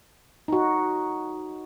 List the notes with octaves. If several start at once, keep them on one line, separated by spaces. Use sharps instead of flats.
D#4 F#4